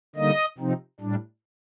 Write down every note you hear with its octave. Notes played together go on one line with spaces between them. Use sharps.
D3 G3 A#3 D#4 D#5
C3 F3 C4 D#4
A2 G3 D4